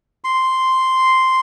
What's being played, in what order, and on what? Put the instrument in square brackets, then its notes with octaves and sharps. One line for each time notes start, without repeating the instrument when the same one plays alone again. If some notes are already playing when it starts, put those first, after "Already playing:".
[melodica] C6